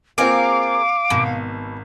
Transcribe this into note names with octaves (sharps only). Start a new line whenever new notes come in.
A#3 C4 F4 G#4 A#4 F5 D6
G#1 B2